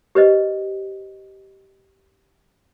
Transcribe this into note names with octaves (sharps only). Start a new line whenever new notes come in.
G4 B4 C5 D#5